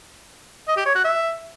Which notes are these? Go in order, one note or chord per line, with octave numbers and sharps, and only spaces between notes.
D#5
G4
C#5
F#4
E5